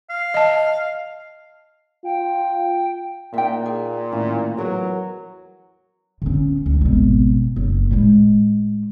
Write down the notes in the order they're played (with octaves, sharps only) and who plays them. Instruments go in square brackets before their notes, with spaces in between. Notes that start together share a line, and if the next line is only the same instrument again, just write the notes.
[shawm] F5
[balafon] D#5 A5
[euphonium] F4 [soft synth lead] G5
[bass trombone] A#2 [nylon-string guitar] A#3 D#4 [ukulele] E5 G5
[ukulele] G#4
[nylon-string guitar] A2 D#3 E4 [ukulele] C#4
[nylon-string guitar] E2 A#4 [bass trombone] F#3
[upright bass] D3 C#4
D2
G#1 B2
F#1
A2 G#3